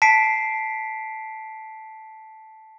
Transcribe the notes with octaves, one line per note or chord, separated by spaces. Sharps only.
A5 B6 C7 D7